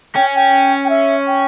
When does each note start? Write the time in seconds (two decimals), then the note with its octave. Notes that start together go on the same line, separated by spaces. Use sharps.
0.16 C#4 G5
0.35 G5
0.85 G5
0.90 E5
1.27 G5